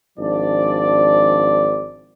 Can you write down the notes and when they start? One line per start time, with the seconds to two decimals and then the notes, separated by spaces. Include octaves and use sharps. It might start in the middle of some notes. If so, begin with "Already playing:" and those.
0.18 G#1 F3 D4 D5